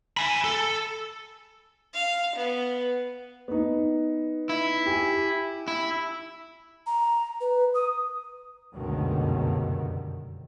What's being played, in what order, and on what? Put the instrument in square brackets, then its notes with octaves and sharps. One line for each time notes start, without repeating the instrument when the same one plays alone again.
[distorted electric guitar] G#5 B5
A4
[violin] F5
B3
[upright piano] B3 D#4
[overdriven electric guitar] E4
[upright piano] G4 G#5
[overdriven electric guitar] E4
[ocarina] A#5
B4
D#6
[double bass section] F1 C#2 F#2 B2 D3 D#3